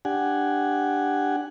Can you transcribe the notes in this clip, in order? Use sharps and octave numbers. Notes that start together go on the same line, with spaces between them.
D4 G4 F#5 G#5